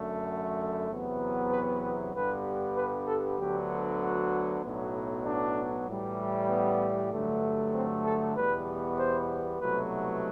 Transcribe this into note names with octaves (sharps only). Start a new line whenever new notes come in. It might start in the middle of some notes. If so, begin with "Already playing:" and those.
Already playing: F#2 D3 A3
E2 C3 F#3 B3
B4
G2 D3 G3 B3 B4
B4
A4
D2 D3 F#3 B3 G4
F#4
B1 A2 F#3 B3
D4
A2 E3 G3
B3
G2 D3 F#3 A3
C4
A4
E2 B2 G3 B3 B4
C5
C2 B2 F#3 A3 B4